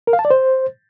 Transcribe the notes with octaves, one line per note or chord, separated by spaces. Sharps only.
A#4
F5
A5
D5
C5